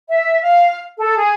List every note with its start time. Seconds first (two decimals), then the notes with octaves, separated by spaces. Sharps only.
0.08 E5
0.41 F5
0.98 A4
1.16 G#4